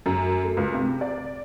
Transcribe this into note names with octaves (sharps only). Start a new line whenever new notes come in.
F#2
A3
C#2
C3
D5